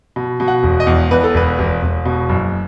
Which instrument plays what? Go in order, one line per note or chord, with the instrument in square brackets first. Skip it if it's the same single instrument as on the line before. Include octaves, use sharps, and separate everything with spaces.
[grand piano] B2
B2
F#5
E1
D#5
E2
E2 B4
A4
E1 B4
E1
E1
B2
F#1